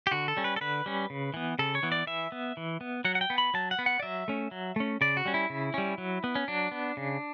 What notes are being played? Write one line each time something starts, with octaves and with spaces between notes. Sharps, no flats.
G4
D3 F#4
A4
G3 C#4
B4
A4
D3 B4
G3 C#4
C#3
E3 B3
C#3 A4
C#5
E3 B3
D5
E3 E5
B3
E3
B3
F#3 F#5
F#5
G5
B3
B5
F#3 A5
F#5
B3
F#5
D5
F#3 E5
A3 C#4
F#3
A3 C#4
C#3 D5
F#4
G3 C#4
E4
C#3
G3 C#4
F#3
B3
C#4
F#3 D4
B3
C#3